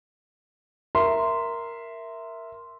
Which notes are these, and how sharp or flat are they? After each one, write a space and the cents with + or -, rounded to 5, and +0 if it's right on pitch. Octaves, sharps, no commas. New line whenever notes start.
A#4 +0 E5 +0 C6 -10